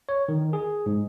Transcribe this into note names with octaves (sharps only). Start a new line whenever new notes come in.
C#5
D#3
G#4
G#2